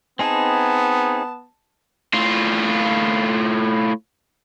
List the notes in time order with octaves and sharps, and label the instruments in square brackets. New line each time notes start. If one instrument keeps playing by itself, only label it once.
[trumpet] B3 [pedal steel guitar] C4 D#4 G#4 [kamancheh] A5
[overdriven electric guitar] A2 F4